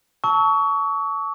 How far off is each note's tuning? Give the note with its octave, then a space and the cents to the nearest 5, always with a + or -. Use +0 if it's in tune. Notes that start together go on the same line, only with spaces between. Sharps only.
A5 +0 C#6 +25 E6 -35